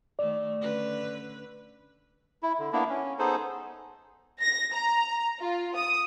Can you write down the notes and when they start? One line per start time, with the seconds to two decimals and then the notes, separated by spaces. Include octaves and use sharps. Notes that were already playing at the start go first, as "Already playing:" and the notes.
0.19 D#3 A3 D5
0.61 D3 C#4 B4
2.43 E4
2.59 D3
2.73 A#3 B3 D4 E4
2.89 C#4
3.19 B3 D#4 G#4 A4 C5
4.42 A#6
4.73 A#5
5.40 F4
5.76 D#6